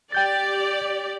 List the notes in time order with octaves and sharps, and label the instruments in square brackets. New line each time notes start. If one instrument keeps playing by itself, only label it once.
[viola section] G4 D5 [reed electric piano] G5 G6 A6